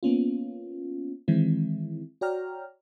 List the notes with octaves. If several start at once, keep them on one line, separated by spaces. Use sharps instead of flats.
A#3 B3 C#4 F4
D#3 E3 G#3 C4 E4
F#4 C#5 D5 G5 A#5 F6